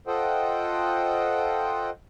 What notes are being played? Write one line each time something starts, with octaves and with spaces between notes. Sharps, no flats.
F4 A4 C5 D#5 F#5 G5